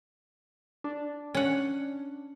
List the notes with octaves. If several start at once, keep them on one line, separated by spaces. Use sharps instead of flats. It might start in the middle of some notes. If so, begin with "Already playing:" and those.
D4
C#4 F#5